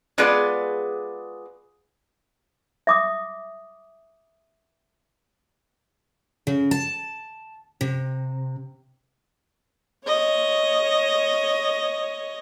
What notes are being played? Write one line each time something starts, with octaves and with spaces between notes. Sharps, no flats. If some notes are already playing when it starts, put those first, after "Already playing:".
G#3 B3 F4 G#4 B4 D5
E5 D6 D#6
C#3
A5
C3
C#5 D#5